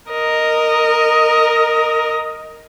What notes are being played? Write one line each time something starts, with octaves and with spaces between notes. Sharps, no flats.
A#4 D#5